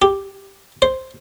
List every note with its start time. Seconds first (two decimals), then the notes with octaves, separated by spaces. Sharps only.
0.02 G4
0.82 C5